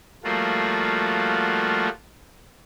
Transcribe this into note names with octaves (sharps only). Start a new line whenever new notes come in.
F3 G3 A3 A#3 F4 F#4